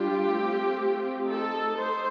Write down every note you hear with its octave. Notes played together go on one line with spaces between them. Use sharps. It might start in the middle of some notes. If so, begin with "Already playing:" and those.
Already playing: G3 D4 F4 G4
A3 C4 F4
A3 D#4 A4
C5